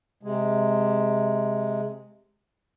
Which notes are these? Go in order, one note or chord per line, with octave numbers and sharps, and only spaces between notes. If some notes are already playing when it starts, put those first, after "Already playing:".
C3 G#3